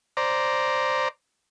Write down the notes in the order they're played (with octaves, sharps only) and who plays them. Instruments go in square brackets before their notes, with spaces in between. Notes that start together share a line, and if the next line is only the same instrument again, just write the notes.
[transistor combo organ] C5 D5 A#5